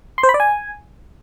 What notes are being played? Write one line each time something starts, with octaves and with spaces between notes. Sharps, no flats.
C6
C5
B5
D5
G#5